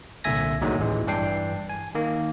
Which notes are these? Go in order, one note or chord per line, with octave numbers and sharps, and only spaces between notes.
C2 A#2 D3 E5 G#5 A#6
D2 A#2 D3 D#3 F#3 G#3
A1 E3 G#3
G2 E3 D4 G5 C7
G#5
D#3 A#3